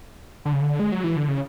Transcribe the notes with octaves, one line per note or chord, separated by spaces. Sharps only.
D3
C#3
D3
G#3
F#3
E3
D3
C#3